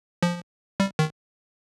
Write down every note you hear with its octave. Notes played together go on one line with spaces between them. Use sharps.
F3
G3
D#3